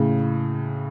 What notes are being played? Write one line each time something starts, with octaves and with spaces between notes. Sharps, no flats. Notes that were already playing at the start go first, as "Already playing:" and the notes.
Already playing: A2 C#3